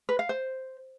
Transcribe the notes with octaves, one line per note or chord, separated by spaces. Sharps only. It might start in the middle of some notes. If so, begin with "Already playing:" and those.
B4
F5
C5